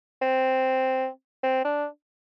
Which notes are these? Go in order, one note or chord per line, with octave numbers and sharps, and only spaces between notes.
C4
C4
D4